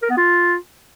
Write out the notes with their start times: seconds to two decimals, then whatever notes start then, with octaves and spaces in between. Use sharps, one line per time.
0.03 A#4
0.10 B3
0.17 F4